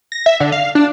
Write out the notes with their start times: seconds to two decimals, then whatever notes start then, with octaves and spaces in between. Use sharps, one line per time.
0.12 A#6
0.26 E5
0.40 D3
0.52 F5
0.75 D4